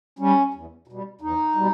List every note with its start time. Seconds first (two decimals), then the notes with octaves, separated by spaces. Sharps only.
0.19 G3 C#4
0.54 E2
0.88 B2
0.93 G3
1.21 E2 D#4
1.55 B2 G3